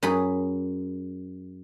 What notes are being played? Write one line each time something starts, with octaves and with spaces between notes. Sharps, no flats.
F#2 G#4 B5